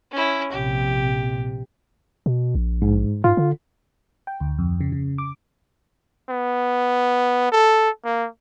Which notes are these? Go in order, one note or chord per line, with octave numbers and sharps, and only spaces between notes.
C#4 E4
A#1 C3 G4
B2
A#1
G#2
G#2 F4
D3
G5
D2
F2
C#3
C#3
D6
B3
A4
A#3